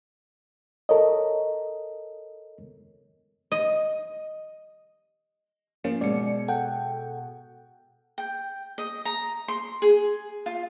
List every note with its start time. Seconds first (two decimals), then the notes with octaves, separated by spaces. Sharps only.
0.89 A4 A#4 C#5 D#5
3.52 D#5
5.84 F3 A#3 C#4
6.01 B2 G#3 D5 C#7
6.48 A4 F#5 G5
8.18 G5
8.78 D#5
9.05 A#5
9.48 C6
9.82 G#4
10.46 F4